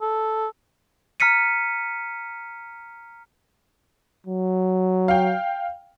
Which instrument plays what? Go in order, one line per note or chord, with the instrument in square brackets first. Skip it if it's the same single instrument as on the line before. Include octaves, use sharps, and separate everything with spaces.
[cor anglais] A4
[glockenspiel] A#5 F6 B6 C#7 D#7
[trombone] F#3
[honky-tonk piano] F5 G5